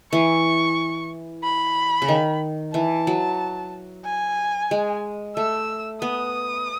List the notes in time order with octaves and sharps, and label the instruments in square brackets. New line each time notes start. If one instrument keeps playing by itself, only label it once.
[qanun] E3 [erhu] C#6
[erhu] B5
[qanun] C#3
D#3
[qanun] E3 [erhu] A5
[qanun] F#3
[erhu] G#5
[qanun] G#3
[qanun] A3 [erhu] E6
[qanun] B3 [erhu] D#6